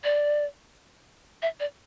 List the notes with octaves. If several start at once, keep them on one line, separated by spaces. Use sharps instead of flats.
D5
E5
D5